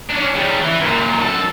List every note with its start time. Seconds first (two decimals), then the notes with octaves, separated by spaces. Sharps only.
0.09 C#4 D4
0.35 C#3 G3
0.61 E3
0.80 F#2 A#2
1.21 F#2 A4